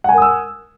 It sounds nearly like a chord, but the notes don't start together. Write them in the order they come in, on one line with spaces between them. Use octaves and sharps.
F#5 G#5 A#4 D#6 E6